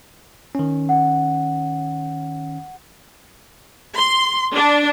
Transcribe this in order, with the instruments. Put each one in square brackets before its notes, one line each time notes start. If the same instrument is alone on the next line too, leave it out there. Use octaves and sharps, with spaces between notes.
[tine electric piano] D#3 C#4
[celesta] F#5
[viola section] C6
D4